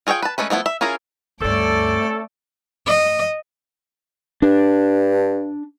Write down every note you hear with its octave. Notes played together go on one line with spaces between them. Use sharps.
F4 G#4 C#5 E5 G5
B4 A5
G#3 A3 C#4 B4
F3 A3 B3 E4
E5
C#4 E4 F4 G#4 A#4
D2 G2 A3 C4 C#4 A4 D5 D6
D#5
G2 D4